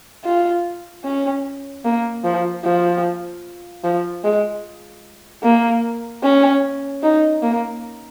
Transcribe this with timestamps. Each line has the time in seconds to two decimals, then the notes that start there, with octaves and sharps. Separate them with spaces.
0.25 F4
1.04 C#4
1.85 A#3
2.24 F3
2.64 F3
3.84 F3
4.24 G#3
5.43 A#3
6.23 C#4
7.03 D#4
7.43 A#3